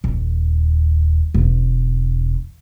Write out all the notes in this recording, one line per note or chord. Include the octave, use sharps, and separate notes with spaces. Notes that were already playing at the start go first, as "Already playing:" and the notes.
D#1
E1